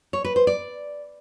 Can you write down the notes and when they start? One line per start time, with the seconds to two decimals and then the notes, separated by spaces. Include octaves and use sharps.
0.13 C#5
0.25 B4
0.36 C5
0.47 D5